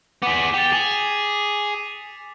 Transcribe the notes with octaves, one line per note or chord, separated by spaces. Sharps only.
B3 G#4 D6 B6
G4 A6 C#7 F7
G#4